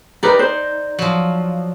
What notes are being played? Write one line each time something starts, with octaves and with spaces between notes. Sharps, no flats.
D#4 G4 A#4 B4 D5
C5
F3 F#3